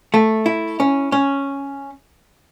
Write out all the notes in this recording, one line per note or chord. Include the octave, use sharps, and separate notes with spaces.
A3
E4
C#4
C#4